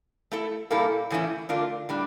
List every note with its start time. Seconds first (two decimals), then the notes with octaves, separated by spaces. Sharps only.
0.32 A3 E4 A4
0.70 A#2 G3 A#3 E4 A4
1.10 A2 E3 A3 C#4 E4
1.49 D3 A3 D4 F4 A#4
1.89 A2 G3 D4